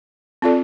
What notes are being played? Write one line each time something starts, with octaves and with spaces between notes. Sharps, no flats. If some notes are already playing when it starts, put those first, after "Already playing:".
C4 F4 A4 D5